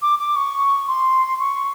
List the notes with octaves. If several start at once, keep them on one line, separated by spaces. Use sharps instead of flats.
D6
D6
C#6
C6
C#6